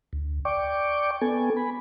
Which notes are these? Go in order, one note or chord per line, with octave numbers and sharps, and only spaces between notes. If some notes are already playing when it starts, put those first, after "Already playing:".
D2
D5 G5 C#6 D6
B3 A4 G#5
B5